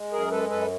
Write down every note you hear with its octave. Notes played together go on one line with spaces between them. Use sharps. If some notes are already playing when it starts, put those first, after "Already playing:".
Already playing: G#3
F#2 G#4 A#4
G#3 A4 B4
F#2 A4 B4